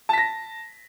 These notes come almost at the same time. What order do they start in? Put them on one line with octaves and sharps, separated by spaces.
A5 B6 A#6